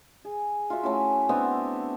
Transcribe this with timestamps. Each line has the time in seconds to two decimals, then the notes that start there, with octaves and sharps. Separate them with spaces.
0.25 G#4
0.70 F4 F#4 E5
0.83 A3 C#4 E4
1.29 B3 C4 D4 E5